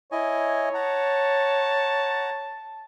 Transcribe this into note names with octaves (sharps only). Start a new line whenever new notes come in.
E4 C#5 D#5 G#5
F#5 A5 A#5